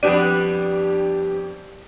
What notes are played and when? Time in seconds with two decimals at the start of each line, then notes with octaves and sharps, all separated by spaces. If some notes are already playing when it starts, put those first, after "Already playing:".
0.03 F2 G3 B3 D4 G4 D5 D#7